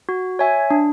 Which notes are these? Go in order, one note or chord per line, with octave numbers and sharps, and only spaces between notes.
F#4
C#5 E5 G#5
D4